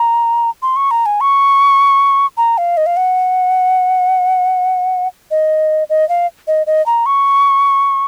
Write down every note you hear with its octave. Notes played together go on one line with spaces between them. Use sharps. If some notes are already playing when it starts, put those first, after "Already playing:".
Already playing: A#5
C6
C#6
A#5
G#5
C#6
A#5
F5
D#5
F5
F#5
D#5
D#5
F5
D#5
D#5
A#5
C#6